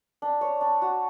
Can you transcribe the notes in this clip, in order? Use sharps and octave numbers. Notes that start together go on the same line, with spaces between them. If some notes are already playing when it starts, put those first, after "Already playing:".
D4
C#5
D4
F#4